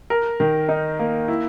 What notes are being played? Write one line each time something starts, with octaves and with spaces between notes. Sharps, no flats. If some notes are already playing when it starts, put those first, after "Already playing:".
A#4
D#3
D#4
A#3
E4